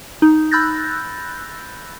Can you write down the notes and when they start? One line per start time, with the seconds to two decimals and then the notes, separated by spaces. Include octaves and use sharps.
0.22 D#4
0.51 B5 E6 F#6 G6 A6 A#6